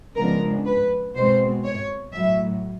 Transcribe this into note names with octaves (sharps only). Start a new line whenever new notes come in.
C#3 F3 G#3 B3 D4 A#4
B4
B2 G#3 C4 C5
C#5
A2 F#3 A3 E5